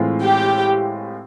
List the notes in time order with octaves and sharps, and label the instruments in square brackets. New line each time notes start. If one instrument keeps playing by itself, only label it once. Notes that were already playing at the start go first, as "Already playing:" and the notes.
Already playing: [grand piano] A2 E3 G#3 C4 F4
[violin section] G4